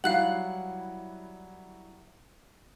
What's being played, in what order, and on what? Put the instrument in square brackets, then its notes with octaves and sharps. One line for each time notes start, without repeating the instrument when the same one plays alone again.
[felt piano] F#3 G3 E4 [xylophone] F5 F#6 F#7 [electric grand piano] F#5